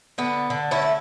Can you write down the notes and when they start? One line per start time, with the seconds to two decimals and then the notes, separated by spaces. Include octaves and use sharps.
0.18 D3 B3
0.50 D3
0.71 C#4 E4
0.82 A3